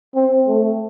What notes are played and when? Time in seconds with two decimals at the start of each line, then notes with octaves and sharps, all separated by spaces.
0.15 C4
0.47 A3